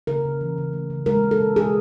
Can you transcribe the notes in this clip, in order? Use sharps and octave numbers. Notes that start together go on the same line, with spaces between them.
C#3 A#4
C#3
E3
C#3
A3
C#3
G#3 A#4
G#3
A4
B2
B2 G#4